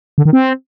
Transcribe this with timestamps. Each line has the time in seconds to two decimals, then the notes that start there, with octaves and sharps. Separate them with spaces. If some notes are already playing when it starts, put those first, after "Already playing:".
0.18 D3
0.25 D#3
0.33 C4